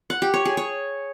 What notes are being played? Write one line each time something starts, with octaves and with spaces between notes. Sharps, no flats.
F#5
G4
C#5
G#4
C#5